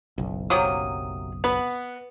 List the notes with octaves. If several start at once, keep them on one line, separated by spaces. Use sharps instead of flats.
F#1 B1
C3 F#3 A#3 D#6
B3 B4